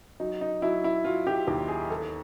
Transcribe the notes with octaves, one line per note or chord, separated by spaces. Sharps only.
F#3 D#4
D#4
F#3 E4
E4
F#3 F4
G4
D#2 G4
G#4
E2 A4